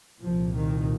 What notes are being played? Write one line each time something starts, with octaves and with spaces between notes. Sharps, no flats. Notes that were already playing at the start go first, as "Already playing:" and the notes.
C2 A#2 F3
D#3